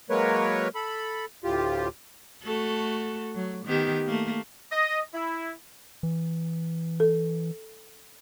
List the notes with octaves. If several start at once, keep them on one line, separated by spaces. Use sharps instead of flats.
F#3 G#3 A#3 A#4 B4 C#5
A4 B5
D2 A2 F4 G4
A3 F#4 A4
F#3
D#3 B3 G4
A3 A#3
D#5
E4
E3
A4